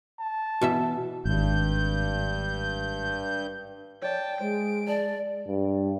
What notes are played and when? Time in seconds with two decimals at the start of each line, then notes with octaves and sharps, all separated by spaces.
0.19 A5
0.61 B2 E3 E5
1.25 G#1 G2 G6
4.02 C#5 D5 G5 A5
4.40 G#3 C5 D7
4.87 D5 A5
5.47 G2